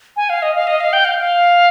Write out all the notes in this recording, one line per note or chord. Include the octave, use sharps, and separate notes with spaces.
G#5
F5
D#5
F5
D#5
F5
G5
F5
F5